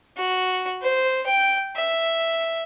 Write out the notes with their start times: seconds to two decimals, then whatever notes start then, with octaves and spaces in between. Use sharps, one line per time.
0.17 F#4
0.82 C5
1.26 G5
1.76 E5